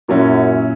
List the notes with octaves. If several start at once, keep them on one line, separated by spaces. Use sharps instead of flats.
F#2 A#2 F#3 C#4 E4